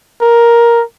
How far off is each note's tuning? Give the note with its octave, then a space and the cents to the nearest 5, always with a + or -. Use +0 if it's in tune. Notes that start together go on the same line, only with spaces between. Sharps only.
A#4 +10